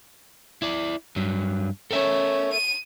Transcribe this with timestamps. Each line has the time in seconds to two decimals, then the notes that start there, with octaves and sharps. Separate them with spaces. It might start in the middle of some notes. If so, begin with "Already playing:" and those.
0.62 E4 D5
1.16 G2 F#3
1.91 C#4 A4 A#4 E5
2.52 D#7